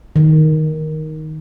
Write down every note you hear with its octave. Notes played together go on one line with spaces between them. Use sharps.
D#3